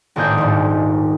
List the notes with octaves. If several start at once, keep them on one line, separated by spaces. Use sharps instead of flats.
G#1 A2 A#3 G#4 D5 G6
D#1 G#2